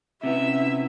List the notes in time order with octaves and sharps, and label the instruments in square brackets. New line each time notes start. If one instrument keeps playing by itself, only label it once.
[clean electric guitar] C3 B3 [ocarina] C#4 [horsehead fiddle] E4 [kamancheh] E5